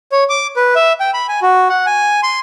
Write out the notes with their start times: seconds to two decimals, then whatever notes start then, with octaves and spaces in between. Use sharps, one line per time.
0.12 C#5
0.29 D6
0.56 B4
0.75 E5
1.00 G5
1.14 B5
1.29 G#5
1.42 F#4
1.69 F#5
1.86 G#5
2.23 C6